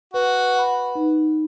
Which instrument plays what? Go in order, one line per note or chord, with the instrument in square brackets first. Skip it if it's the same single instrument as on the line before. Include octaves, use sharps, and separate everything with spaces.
[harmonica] F#4 [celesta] B4
[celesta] F#5 B5
D#4